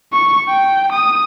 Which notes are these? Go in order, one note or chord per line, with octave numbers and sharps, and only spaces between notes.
C#6
G5
D#6